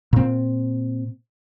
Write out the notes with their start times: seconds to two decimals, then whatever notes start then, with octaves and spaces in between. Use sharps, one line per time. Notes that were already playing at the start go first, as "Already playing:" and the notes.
0.13 A#2 C4